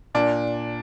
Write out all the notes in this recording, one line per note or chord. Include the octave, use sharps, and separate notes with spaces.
A#2 D4